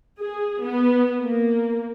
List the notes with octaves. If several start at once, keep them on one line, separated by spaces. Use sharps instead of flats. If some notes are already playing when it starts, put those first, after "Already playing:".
G#4
B3
A#3